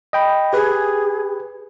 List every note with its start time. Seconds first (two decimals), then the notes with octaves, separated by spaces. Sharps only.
0.13 D#5 G5 B5
0.53 G4 G#4 B4